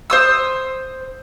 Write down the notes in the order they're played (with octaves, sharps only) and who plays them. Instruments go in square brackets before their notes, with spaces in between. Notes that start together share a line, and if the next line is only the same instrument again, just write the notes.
[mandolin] C5 D#6 E6